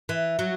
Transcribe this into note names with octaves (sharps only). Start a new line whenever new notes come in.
E3
F#3